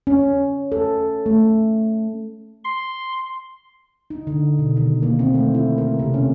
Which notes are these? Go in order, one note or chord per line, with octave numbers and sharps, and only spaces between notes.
C#4
A4
A3
C6
D#4
D3
B2
D#3
A#3
C4
A3
E4
A#4
C3
C#4